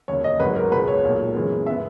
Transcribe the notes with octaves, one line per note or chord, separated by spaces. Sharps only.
E1 D#2 C#3 C#5
D#5
G#1 G#2 F#3 B4
A#4
C#2 B2 G#3 B4
C#5
B1 A#2 G#3
F#2 E3 G#3 B3
C#3 G#3 B3 E5